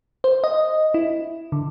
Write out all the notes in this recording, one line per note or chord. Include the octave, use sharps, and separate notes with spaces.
C5
D#5
E4
D3